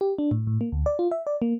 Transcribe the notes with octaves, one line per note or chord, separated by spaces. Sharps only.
G4
D4
A2
A2
A#3
D2
D5
F4
E5
D5
A#3